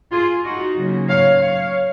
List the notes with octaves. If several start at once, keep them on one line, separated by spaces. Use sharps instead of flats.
F4 G#4
D#4 F#4
C#3 F#3 A#3 C#4
C#5 F5
C#5 F5